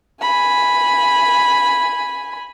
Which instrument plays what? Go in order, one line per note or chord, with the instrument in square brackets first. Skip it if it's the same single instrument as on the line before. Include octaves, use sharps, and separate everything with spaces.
[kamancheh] G#5 B5